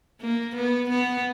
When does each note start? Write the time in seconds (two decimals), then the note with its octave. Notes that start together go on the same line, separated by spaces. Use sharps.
0.22 A#3
0.55 B3
0.90 B3